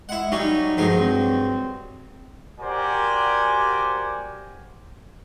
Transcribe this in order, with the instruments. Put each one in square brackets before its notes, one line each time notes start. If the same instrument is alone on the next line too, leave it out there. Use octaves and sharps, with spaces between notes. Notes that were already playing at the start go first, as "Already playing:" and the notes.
[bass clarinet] G#3 [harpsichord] E4 F#5
[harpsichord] F#3 G3 C#4 [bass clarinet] D#4
[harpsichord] G2 F#3 G#3 [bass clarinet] F3
[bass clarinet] C4
[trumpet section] F#4 G4 A#4 C5 D5 G#5